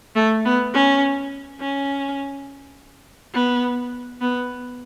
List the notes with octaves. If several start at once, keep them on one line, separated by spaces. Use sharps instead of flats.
A3
B3
C#4
C#4
B3
B3